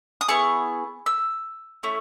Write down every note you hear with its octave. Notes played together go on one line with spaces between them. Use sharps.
D#6
B3 E4 G#4 C#6
E6
A3 C#4 E4